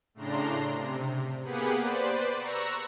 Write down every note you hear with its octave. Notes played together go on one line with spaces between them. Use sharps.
A2 C#3 D4 A#5 C6
C3
A#3 B3 G4 G#4 B4 F#5
B4 C5 D5
A#5 C#6 E6 F#6 A#6